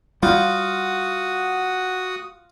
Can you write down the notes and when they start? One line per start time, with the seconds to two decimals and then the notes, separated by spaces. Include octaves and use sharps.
0.23 G3 F4 F#4 F#5 D#6